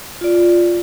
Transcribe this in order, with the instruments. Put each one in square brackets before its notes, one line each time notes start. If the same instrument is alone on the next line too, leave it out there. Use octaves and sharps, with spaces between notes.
[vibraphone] F4 D5